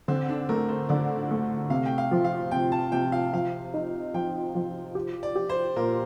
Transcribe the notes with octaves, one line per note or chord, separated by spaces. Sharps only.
D3 C4
D4
A3 A#4
C5
D3 D5
A3
C3 F5
G5
F5
F3
F5
C3 G5
A5
C3 G5
F5
F3 F5
D#4
F3 G5
F3
G4
D5
G4
C5
A#2 A#4